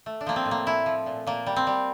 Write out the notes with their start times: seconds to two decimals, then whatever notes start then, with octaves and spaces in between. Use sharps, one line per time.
0.06 A3
0.21 D4
0.26 F3 A#3
0.36 C4
0.46 A2
0.51 A#3
0.66 A3 E4
0.86 F3
1.06 A#2
1.27 A#2 A#3
1.46 G3
1.56 C4
1.67 G3